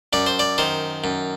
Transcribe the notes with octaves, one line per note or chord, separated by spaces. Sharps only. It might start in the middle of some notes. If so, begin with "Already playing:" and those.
F#2 D5
C5
D5
D#3 C5
F#2